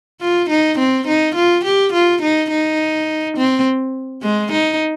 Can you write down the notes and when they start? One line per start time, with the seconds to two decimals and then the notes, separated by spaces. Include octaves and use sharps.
0.21 F4
0.50 D#4
0.78 C4
1.07 D#4
1.35 F4
1.65 G4
1.93 F4
2.22 D#4
2.50 D#4
3.37 C4
4.23 G#3
4.52 D#4